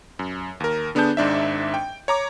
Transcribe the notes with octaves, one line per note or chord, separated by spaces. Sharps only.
F#2
D#2 A#4
D3 B3 D4 G#4 A5 G6
G#1 G#2 D4 E5
G5
C#5 A#5 D6